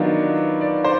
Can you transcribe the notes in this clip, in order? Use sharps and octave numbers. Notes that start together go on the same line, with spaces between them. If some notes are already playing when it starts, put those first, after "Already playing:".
Already playing: D#3 F#3 B3 D4 F4
D5
C5